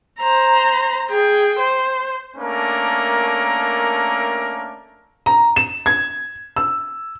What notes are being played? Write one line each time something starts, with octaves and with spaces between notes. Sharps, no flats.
C5 A#5
G#4 G5
C5
A3 A#3 C#4 D4 A#4
A#5
E7
G#6
E6